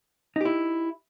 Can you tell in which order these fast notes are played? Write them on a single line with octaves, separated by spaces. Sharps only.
D#4 G4 E4